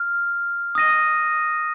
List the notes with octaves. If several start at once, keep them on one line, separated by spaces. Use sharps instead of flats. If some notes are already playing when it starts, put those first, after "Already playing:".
Already playing: F6
D#6 A#6 D#7